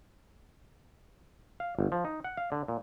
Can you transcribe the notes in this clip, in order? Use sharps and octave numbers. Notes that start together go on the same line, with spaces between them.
F5
G1
F3
D#4
F#5
F5
D3
A#2